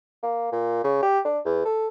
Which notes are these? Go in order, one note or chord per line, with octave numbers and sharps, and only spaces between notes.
A#3
A#2
C#3
G4
D4
E2
A4